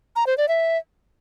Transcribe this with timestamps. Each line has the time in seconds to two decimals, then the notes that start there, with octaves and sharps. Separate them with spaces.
0.16 A#5
0.27 C5
0.38 D5
0.48 E5